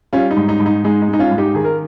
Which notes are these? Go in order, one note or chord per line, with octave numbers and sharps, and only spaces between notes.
G3 C#4 F4
D#4
G#2
D#4
G#2
D#4
G#3 D#4
D#4
G#3
D#4
C#4 F4
G#2
D#4 G4
D#3 G#4
A#4